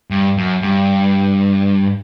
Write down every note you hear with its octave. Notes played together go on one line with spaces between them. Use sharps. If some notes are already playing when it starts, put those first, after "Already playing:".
G2
F#2
G2